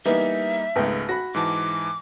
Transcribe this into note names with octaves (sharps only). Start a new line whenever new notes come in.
E3 G3 A#3 B3 D#4 E5
G#1 C#2 A3 B3 G5
F#4 B5 A#6
G#2 E3 A5 D6